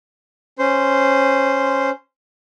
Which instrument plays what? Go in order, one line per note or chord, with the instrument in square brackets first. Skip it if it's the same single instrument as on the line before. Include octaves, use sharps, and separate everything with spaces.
[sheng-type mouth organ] C#4 C5 C6